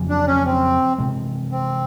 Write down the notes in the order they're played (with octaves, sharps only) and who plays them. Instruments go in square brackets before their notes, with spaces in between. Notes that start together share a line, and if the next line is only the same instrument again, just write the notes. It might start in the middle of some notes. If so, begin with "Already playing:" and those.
Already playing: [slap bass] F2 C#3 F#3
[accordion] D4
C#4
C4
[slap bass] C3 E3 G#3
[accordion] C4